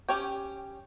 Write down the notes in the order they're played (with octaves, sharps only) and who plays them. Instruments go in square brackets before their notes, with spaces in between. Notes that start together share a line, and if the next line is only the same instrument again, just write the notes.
[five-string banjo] C#4 G4 C#5 G5